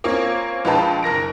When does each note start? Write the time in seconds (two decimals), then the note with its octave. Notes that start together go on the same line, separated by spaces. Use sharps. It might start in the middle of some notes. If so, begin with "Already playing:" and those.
0.04 A#3 C4 C#4 F4
0.65 A#1 G#3 F4 B4 G5 A5
1.03 F#1 A#4 A#6 D7